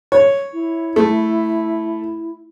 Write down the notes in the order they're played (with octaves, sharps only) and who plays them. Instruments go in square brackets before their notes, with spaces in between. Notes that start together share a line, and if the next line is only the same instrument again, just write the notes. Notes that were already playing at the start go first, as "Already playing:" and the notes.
[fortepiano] C#5
[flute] E4
[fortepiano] A3